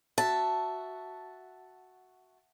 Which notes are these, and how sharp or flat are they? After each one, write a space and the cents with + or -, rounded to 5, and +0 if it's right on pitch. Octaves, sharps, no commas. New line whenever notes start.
F#4 +0 E5 +0 A5 +0